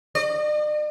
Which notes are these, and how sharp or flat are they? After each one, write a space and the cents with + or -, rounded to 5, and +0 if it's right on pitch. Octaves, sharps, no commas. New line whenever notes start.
D5 +45